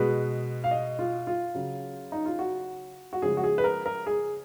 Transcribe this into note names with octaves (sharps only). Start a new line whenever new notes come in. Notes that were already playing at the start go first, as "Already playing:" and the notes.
Already playing: B2 G#3 B4
F5
D#5
F4
F4
C#3 F#3
D#4
F4
F#4
F#4
C#3 F3 G#3 G#4
F#4
G#4
B4
A#4
A#4
G#4